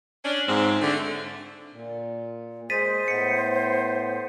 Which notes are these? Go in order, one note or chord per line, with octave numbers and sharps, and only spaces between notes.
C#4 D4
G#2 C3 F3 C4
D3 A3
A#2
G#3 G#4 C5 A6 B6 D#7
A2 B3 B6 C#7